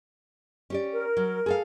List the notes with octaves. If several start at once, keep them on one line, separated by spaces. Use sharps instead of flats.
C#4 G4 D5
A#4
F#3
G#4 A4 F5